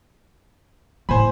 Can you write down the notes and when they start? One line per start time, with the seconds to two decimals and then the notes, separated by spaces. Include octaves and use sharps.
1.09 A2 A#3 C5 G#5 B5